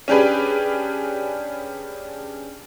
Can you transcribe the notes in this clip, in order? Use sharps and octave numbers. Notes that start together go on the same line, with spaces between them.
C#4 D4 G4 G#4 B4